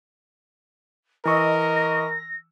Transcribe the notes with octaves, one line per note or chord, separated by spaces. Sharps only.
E3 A#4 D#5 C#6 E6 A#6